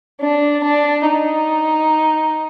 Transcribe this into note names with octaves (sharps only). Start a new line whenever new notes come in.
D4
D4
D#4